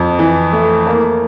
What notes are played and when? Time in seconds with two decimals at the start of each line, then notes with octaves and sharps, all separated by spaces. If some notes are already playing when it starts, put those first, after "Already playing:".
Already playing: F2
0.19 E3
0.52 A3
0.87 A#3